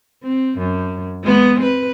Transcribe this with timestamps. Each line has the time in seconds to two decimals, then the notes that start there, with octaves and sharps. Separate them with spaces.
0.23 C4
0.58 F#2
1.23 G#3 B3
1.60 C4 B4